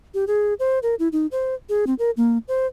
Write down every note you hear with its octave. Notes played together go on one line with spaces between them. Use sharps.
G4
G#4
C5
A#4
E4
D#4
C5
G#4
C4
A#4
A#3
C5